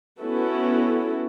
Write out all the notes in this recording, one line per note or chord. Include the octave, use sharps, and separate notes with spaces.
B3 C#4 E4 F#4 A4